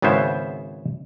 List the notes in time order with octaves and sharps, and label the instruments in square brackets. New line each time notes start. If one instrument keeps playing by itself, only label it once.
[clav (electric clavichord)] G#1 C#3 B3 E4 C5 E5